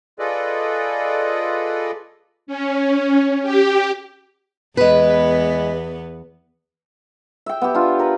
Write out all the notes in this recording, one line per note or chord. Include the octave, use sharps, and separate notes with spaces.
F4 G#4 A4 B4 D5 D#5
C#4
G4
E2 G#3 B3 B4
E5 G5
B3 G4
D4 F4
A#4 B4